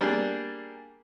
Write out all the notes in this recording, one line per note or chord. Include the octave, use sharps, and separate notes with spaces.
G3 A#3 D4 G#4